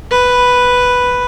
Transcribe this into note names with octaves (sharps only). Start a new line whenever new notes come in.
B4